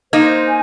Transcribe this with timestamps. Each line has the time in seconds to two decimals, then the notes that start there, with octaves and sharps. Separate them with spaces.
0.13 A#3 D#4 C5
0.46 G#5